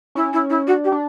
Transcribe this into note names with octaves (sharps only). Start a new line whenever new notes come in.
C#4 E4
E4
E4
D4 F#4
G4
D4